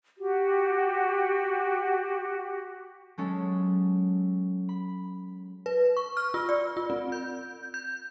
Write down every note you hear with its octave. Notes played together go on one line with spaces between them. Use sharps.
F#4 G4
F#3 G#3 C#4 A4
B5
B4
C#6
F6
F4
D5
F4
C4
G6
G6